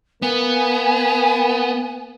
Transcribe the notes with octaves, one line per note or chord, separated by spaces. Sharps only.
A#3 B3 G#5